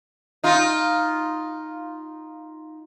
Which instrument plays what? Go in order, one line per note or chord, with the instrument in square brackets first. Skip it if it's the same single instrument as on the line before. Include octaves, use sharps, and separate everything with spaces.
[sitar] D#4 F4